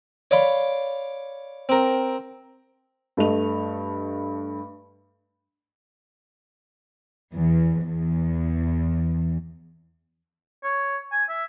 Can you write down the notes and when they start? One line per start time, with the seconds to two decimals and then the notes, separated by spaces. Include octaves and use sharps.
0.31 C#5 D5 F5 B5 C6
1.69 C4 A#4
3.17 G2 A3 D#5 F7
7.33 E2
7.83 E2
10.63 C#5
11.12 G#5
11.29 E5